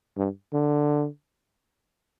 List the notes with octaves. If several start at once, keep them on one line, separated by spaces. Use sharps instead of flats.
G2
D3